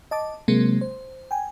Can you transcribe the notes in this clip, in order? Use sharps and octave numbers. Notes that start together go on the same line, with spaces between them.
D#5 A5 D6
C3 F#3 G#3 A#3 C4
C5
G5 G#5